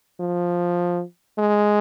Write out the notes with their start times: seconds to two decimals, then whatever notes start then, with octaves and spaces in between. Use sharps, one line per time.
0.20 F3
1.38 G#3